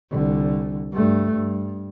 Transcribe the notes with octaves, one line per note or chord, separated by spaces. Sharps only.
C2 D3
G2 A3
G2